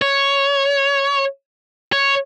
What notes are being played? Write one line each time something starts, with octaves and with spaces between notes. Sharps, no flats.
C#5
C#5